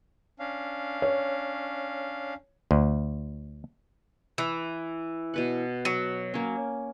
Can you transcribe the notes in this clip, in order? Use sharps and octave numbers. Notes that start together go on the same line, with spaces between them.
C#4 D4 F5
C#5
D2
E3
B2 B4 F#5
F#3
A#3 C#4